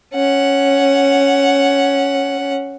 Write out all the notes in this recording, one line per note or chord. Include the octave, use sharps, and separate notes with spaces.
C#4 F#5